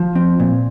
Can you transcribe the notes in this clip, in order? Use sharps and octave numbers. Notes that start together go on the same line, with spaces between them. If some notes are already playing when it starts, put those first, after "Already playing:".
Already playing: F3
C4
A#2